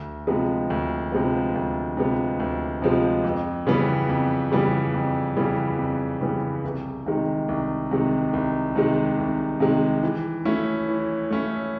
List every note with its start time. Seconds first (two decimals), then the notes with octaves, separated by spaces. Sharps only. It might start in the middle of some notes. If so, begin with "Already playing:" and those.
Already playing: D2
0.27 C3 F3 G#3 B3
0.70 D2
1.12 C3 F3 G#3 B3
1.55 D2
1.97 C3 F3 G#3 B3
2.40 D2
2.82 C3 F3 G#3 B3
3.24 F2
3.67 C#3 E3 G3 B3
4.09 F2
4.52 C#3 E3 G3 B3
4.94 F2
5.37 C#3 E3 G3 B3
5.78 F2
6.21 C#3 E3 G3 B3
6.64 C2
7.06 C3 D#3 G#3
7.49 C2
7.91 C3 D#3 G#3
8.33 C2
8.75 C3 D#3 G#3
9.18 C2
9.60 C3 D#3 G#3
10.03 E3
10.45 A3 C#4 E4
10.88 E3
11.30 A3 C#4 E4